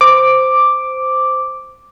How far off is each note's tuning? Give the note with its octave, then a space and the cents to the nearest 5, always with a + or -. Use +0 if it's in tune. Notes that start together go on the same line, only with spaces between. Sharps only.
C5 -10 D6 +0